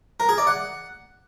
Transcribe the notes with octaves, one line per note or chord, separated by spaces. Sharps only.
A#4
G#4
D5
F#5